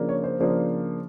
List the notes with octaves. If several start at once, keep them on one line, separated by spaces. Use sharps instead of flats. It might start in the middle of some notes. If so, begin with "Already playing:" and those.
Already playing: C#3 F3 A#3 D4
C#5
C5
C#3 F3 A#3 D4